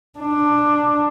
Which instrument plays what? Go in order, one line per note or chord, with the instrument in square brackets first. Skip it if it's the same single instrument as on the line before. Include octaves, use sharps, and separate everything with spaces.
[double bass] D4